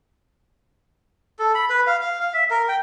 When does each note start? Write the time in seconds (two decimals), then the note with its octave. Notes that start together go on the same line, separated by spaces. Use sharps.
1.39 A4
1.55 B5
1.70 B4
1.87 F5
2.01 F5
2.20 F5
2.33 E5
2.51 A#4
2.68 G5